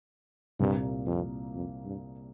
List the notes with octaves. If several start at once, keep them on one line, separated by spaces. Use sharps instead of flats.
C2 G2 A#2 A#3
F2
F2
G2